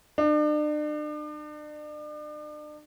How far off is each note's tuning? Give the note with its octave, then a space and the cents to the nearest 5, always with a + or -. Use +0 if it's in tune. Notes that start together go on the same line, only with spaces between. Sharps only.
D4 +40